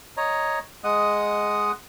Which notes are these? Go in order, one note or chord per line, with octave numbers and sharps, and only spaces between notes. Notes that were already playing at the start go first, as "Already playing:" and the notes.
C#5 D#5 A#5
G#3 D#5 F#5 D#6